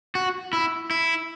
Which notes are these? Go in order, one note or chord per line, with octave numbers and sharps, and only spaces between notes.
F#4
E4
E4